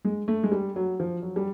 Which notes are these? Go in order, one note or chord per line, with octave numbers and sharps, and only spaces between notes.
G#3
A3
G#3
G3
F#3
F3
F#3
G3